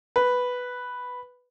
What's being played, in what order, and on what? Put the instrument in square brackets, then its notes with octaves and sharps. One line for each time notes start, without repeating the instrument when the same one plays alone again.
[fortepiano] B4